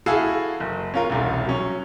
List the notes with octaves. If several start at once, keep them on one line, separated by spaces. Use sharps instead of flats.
E4 F#4 G#4 A4 F5
F#1
C#4 F4 A#4
E1 C2
F#3 C#4